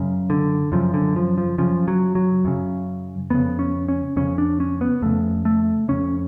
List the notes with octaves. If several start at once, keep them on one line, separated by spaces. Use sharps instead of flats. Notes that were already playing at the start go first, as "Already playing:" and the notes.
Already playing: F#2 C#3
D3
F#2 C#3 F3
D3
F3
F3
F#2 C#3 F3
F#3
F#3
F#2 C#3
F2 C#3 B3
C#4
C#4
F2 C#3 C#4
D4
C#4
B3
F2 C#3 A3
A3
F2 C#3 C#4